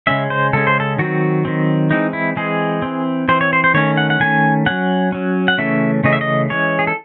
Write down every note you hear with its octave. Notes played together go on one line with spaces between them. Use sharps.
C#3 G#3 C#4 E5
C5
C#3 G#3 C#4 A4
C5
A4
D#3 F#3 C4 F#4
D#3 F#3 C4
E3 G#3 C4 D#4
E4
E3 G#3 C4 G#4
E3 C4
E3 C4 C5
C#5
C5
C5
D#3 A3 C#4 C#5
F#5
F#5
D#3 A3 C#4 G#5
F#3 C#4 F#5
F#3 C#4
F#5
C#3 E3 A3 C#4 E5
C#3 E3 A3 C#4 D#5
E5
D#5
E3 G#3 C#4 C#5
G#4
A4